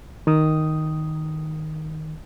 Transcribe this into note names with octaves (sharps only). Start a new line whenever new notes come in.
D#3 D#6